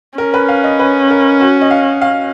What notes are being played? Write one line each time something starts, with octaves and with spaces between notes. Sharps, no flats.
C#4 A#4
B4
F5
D#5
B4
A#4
F#4
D#5
F5
F5